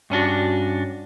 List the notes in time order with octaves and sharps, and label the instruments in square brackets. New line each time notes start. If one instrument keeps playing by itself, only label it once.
[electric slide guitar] G2 C#4 D4 F#4